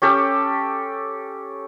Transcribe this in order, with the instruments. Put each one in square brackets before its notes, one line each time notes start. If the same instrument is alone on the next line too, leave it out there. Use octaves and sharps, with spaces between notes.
[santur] C#4 G4 A4